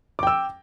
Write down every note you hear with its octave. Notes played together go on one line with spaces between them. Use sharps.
G5 D6 E6